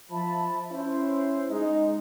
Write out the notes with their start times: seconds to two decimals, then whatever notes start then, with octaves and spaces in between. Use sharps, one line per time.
0.11 F3 E5 A5 B5
0.72 C#4 E4 C5
1.50 G#3 D#4